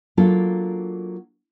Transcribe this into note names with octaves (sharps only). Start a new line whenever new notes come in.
F#3 A#3 D4 F4 A4